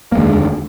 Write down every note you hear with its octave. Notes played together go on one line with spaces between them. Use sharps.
A#3
F1 D#2 D3 G#3